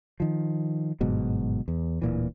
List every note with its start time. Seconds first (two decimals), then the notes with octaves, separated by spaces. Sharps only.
0.20 D#3 F3
1.00 G1 G#2 B2 F#3
1.68 E2
2.02 D1 A#2 E3